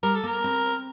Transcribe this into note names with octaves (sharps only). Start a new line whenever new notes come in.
G3 A#4
A4
A#3 A#4
C4